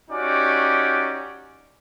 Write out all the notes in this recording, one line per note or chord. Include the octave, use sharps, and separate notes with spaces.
C#4 D#4 F#4 G4 D5